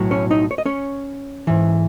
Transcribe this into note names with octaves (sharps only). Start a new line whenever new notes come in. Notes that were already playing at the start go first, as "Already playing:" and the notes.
Already playing: B1 A2 F#3
C#4 C#5
D#4 D#5
C#5
D#5
C#4 C#5
G#2 E3